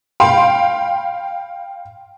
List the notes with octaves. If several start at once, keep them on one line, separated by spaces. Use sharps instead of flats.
F5 G5 B5 C6